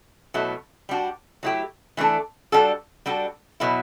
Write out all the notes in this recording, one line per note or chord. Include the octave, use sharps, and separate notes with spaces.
B2 F#3 A3 E4
G3 D4 F#4
F#3 A3 E4 G4
E3 A3 D4 A4
G3 D4 F#4 A4
G3 D4 F#4 A4
B2 F#3 B3 E4